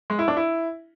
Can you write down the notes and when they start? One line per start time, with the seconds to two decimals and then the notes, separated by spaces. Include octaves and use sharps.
0.10 G#3
0.19 E4
0.28 D4
0.37 E4